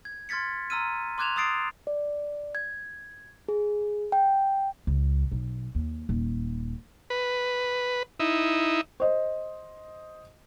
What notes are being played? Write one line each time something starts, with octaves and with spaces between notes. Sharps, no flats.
G#6
C6 F6 G#6 A6 B6 C#7
A#5 C6 E6 F6 D#7
C6 D6 F#6 G#6 E7 F7
C6 D#6 E6 A6 C7 D7
D5
G#6
G#4
G5
C#2
B1
D#2
D#1
B4
D#4 E4
C5 D#5